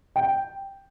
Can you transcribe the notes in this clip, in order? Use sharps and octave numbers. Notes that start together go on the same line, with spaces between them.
G5